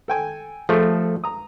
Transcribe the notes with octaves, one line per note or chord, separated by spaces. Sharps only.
A4 G5 G#5
F3 A3 G#4 A4 C#6
A#5 D#6